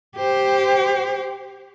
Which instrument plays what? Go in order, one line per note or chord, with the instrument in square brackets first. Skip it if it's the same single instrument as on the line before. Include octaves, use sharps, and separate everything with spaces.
[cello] G4 C5